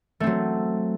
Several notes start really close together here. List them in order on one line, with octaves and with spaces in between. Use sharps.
A3 C4 F#3